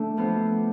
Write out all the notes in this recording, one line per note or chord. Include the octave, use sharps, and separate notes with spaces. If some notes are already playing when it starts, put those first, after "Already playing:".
Already playing: D3 A3 D4
F3 B3 F4